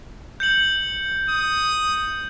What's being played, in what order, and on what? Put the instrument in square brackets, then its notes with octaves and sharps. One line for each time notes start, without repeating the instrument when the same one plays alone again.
[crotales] G6 C#7 F#7
[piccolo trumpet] D#6